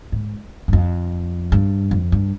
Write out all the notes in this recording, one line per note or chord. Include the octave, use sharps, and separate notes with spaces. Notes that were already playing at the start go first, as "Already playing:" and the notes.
G#2
G2
F2
G2
F2
G2